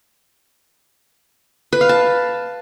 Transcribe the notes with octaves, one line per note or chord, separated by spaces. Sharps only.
B4
F5
A5